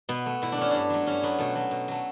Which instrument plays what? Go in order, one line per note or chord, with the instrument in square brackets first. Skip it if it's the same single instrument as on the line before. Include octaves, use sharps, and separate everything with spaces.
[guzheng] B2 B3
A3
B2 E4
D4
A3 C#4
G2 D4
F#3 A3
G2 C#4
F#3 A3 B3
B2 A3
F#3 A3
B2
F#3 A3